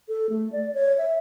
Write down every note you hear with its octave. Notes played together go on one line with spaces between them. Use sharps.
A4
A3
D5
C#5
E5